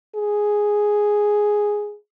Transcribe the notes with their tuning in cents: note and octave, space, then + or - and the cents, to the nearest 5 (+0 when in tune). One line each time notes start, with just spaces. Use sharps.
G#4 +0